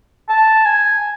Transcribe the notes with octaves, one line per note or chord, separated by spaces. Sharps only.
A5
G#5